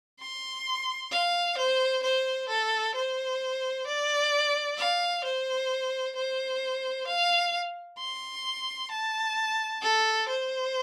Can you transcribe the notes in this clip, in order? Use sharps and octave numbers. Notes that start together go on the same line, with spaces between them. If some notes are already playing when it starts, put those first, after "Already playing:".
C6
F5
C5
C5
A4
C5
D5
F5
C5
C5
F5
C6
A5
A4
C5